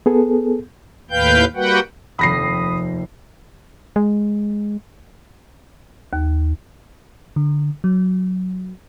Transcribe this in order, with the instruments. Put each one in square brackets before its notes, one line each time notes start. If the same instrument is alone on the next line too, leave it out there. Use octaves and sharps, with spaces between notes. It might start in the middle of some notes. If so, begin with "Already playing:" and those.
[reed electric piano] B3 G#4 A4
[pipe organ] D#2 A2 B4 F5 G5 G6
G3 A#3 F#4 B4 F#5 G5
[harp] F1 D#2 [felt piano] B5 A#6 C7 [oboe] D#6
[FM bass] G#3
[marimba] D#2
[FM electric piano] D3
F#3